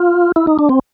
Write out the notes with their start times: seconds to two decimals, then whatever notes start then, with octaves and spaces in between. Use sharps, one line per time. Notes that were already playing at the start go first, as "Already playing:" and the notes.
Already playing: F4
0.36 E4
0.47 D#4
0.59 D4
0.69 C4